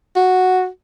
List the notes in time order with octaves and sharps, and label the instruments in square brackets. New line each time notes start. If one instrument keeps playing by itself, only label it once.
[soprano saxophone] F#4